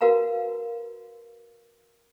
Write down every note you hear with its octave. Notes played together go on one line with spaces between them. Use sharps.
F#4 A#4 B4 F5 A5 A#5